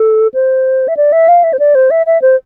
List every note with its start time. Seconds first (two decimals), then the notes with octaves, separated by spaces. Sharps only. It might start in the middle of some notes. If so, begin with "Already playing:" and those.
Already playing: A4
0.34 C5
0.88 E5
0.97 D5
1.12 E5
1.28 F5
1.44 E5
1.53 C5
1.59 D5
1.75 C5
1.91 E5
2.06 E5
2.22 C5